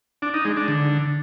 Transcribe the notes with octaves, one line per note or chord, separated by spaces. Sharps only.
D4
D#4
G#3
D4
D3